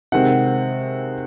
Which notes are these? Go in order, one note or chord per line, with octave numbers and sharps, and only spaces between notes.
C3 D#3 G#3 C4 F#5